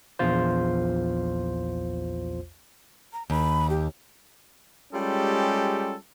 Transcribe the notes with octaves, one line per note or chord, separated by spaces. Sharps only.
A#1 E2 F4 C5
A#5
D#2 B5
G4
G3 G#3 C#4 F4 G4 A4